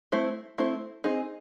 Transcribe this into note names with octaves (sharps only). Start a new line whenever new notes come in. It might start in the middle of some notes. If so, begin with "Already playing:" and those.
A3 C4 E4 C5
A3 C4 E4 C5
C4 D#4 G#4